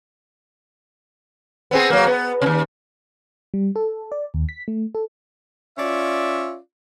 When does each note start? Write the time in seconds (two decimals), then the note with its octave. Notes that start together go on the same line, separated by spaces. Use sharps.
1.71 B3 C4 G#4
1.90 F#3 A#3
2.06 B3
2.42 D#2 C3
3.54 G3
3.76 A4
4.12 D5
4.34 D#2
4.49 B6
4.68 A3
4.95 A4
5.78 C#4 F4 D5 E5